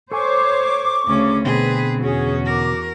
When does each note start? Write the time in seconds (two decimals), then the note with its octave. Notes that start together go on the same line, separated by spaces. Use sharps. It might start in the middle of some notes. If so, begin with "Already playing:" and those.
0.12 A4 C5 C#5 G#5 C#6 D6
1.07 D2 C#3 C#4
1.44 B2 D3 C4 G#4 B4
2.04 E2 C#4 F#4 G#4
2.46 A#4 D6